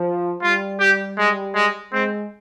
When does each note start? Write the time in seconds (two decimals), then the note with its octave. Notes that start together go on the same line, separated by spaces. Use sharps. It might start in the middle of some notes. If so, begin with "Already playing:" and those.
Already playing: F3
0.42 G3 F4
0.79 G4
1.17 G#3
1.55 G#3
1.92 G#3 C4